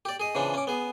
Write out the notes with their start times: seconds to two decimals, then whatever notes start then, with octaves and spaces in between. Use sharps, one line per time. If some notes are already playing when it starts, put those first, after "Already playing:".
0.05 G4 D5
0.20 G#4 D#5
0.35 C#3 E3 F3 D4
0.54 C#4 D6
0.67 B3 G#4